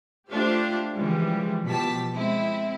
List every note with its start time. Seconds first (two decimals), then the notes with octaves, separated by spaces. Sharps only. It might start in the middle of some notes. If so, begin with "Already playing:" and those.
0.31 A3 D4 F4 G4 C5 F5
0.94 C#3 E3 F3 G3 G#3
1.65 B2 F3 G4 A5 B6
2.12 G#3 C4 E4